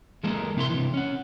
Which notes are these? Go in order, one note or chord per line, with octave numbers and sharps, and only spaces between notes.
E3 G#3 A#3 A4 A#4 D#5
C3 E4 C#5 C6
C3 E3
C#4 F#5